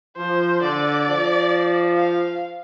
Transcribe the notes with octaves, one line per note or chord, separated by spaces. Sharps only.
F3 C5
D3 D5
F3
F5